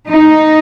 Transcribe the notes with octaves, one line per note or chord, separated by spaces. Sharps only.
D#4